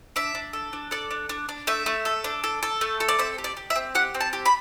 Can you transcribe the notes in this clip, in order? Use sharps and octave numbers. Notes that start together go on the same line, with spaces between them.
D4 E5
D4
A4
D4
A4 D5
D4
D4
D4
A3 E5
A3
A4
D4
A4
A4
A3
A4
D5
C4 E5
G4
D5
G4
E5
C4
G4 F#5
C4
A5
G4
B5